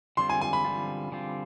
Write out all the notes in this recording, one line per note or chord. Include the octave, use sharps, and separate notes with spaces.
D3 G3 C4 F4 C6
G#5
G#5
B5
D3 G3 C4 F4
D3 G3 C4 F4